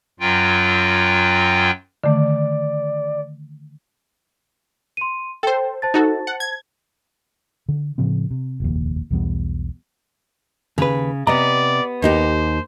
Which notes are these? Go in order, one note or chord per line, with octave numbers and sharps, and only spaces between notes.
F#2 F#3 F4 G5
D3 D#3 A3 D5
C6 D#7
A4 C5 G5
C5 A5 A6
D#4 F#4 A4
F#5
G#6
D3
A2 C#3 F3 C4
C3
F1 A#1 D#2
B1 E2 G3 B3
D#2 C#3 B4
C3 B3 D5 D#5 A#5
D#2 D#4 G4 C5